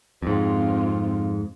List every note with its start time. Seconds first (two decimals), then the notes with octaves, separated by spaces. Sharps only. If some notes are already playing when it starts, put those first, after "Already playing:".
0.22 F2 G#2 C4 F4